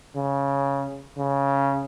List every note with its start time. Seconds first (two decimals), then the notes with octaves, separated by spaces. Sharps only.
0.16 C#3
1.18 C#3